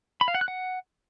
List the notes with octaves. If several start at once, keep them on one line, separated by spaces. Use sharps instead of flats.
B5
F5
F#5
F#6
F#5